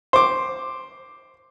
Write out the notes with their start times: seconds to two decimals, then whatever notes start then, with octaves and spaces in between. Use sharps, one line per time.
0.13 C5 D6